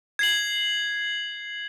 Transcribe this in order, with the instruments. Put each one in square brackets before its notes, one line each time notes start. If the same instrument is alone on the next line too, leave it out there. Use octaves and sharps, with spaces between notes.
[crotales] G#6 C7 F#7